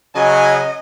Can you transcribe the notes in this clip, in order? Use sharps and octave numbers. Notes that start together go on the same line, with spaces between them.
C#3 F#3 D#5 G#5